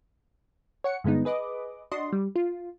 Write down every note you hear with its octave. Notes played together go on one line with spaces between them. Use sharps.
C#5 F#5 C#7
G2 D3 G#3 B3 D#4
G#4 B4 D#5 D6
D4 F#4 D#5 C6
G3
F4